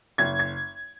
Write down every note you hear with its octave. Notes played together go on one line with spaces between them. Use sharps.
F#1 G#6
G#6